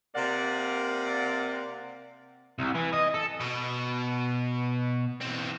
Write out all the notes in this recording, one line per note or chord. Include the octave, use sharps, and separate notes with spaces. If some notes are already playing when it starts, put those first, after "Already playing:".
C3 A#3 D5 F#5
C2
E3
D#5
A4
B2
E3 C4